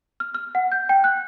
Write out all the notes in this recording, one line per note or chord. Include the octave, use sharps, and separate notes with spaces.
F6
F6
F#5
G6
G5
F#6